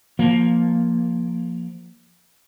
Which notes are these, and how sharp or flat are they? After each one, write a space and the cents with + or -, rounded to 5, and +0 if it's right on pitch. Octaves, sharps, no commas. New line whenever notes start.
F3 +0 A#3 +5